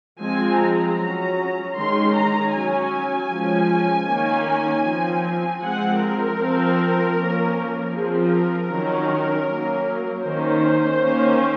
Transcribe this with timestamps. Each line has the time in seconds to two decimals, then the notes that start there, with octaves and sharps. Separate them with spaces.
0.23 F3 G#3 C4 G#5
0.61 A#5
1.00 F#3 C#4
1.77 D#3 G#3 C#4 C6
2.16 A#5
2.54 F#3 C#4 G#5
3.31 F3 G#3 C#4
4.09 D#3 A#3 C#4
4.86 F3 C4
5.63 F3 G#3 C4 F#5
6.02 A#4
6.39 F3 C4
7.17 F3 A#3 C#4
7.94 F3 C4 G#4
8.33 A#4
8.71 D#3 F#3 C#4
9.49 F#3 A#3 C#4
10.25 D#3 A#3 C#4 C5
11.03 D#3 A#3 C#4